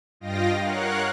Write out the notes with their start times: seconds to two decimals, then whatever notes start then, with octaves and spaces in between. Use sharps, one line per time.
0.20 G2 F4 D#5 F5 G5 A#6
0.62 A#4 C#5 F5 F#5 F#6